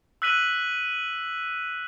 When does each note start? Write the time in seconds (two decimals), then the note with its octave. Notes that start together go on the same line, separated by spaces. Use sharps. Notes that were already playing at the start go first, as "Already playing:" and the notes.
0.22 E6 F#6 B6 D#7 F#7